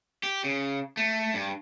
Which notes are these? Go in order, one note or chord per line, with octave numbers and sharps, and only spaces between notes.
G4
C#3
A3
G2